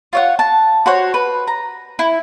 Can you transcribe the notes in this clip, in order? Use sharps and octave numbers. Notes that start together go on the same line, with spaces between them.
F4 C#5 F#5
A5
F#4 C5 C#5
B4
A#5
E4